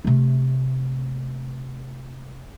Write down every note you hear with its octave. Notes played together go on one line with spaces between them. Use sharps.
C3 A3